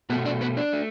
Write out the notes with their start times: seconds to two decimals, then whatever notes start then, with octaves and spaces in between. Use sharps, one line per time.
0.10 B2 A3 B3 B4
0.25 D4 D5
0.41 B3 B4
0.57 D4 D5
0.73 A3